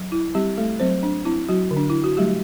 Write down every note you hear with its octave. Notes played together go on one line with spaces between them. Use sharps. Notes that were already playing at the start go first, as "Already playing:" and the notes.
Already playing: F#3
E4
G3 C4 G4
A3 A4
F#3 C4 C5
D4
C4 E4
F#3 F#4
D3
D4
E4
F#4
F#3 G3 A3 G4